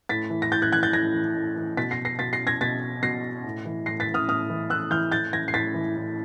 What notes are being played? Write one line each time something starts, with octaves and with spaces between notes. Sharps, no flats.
A2 A6 B6
E3
A#6
A2 G6 A6
F#6 G#6
E3 F#6 G#6
G6 A6
A2 G#6 A#6
E3
A2
E3
B2 A6 B6
A#6 C7
A#6 C7
B2 A6 B6
A#6 C7
G#6 A#6
B2 A6 B6
B2 A#6 C7
A2
E3
A2 A#6 C7
A6 B6
E3
D#6 F6
A2 D#6 F6
E3
A2 E6 F#6
E3 F6 G6
A2 G6 A6
E3 G#6 A#6
C7
A2 A6 B6
E3
A2